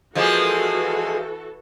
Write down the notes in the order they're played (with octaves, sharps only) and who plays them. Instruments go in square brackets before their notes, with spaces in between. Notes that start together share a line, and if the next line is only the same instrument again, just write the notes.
[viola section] E3 F#4 A4 [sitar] F3 G#3 A#3